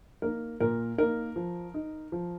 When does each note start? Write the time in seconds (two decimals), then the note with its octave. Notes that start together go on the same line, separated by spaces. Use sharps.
0.22 A#3 D#4 A#4
0.60 A#2 A#4
0.98 A#3 D#4 A#4
1.36 F3
1.74 D#4
2.12 F3